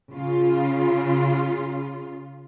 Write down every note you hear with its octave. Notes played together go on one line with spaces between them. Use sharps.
C#3 F4